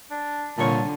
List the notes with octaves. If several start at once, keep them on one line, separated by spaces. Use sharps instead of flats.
D4
C2 A#2 D3 C#5 A5